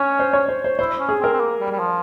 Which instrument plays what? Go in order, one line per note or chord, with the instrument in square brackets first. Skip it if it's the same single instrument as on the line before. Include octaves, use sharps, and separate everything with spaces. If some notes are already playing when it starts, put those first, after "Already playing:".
Already playing: [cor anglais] C#4 [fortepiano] C#5
[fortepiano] C5
C#5
C5
C5
[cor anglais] E4 [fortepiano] C5
[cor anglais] C#4
[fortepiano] G#4
[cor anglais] C4 [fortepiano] A#4
[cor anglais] C4
A#3
G3
G3
F3